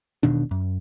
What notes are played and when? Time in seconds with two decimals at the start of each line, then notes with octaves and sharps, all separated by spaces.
0.23 E1 B2 D#3 D4
0.51 F#2